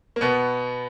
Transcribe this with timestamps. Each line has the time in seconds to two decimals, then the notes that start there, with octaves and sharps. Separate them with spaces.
0.16 A#3
0.21 B2 B3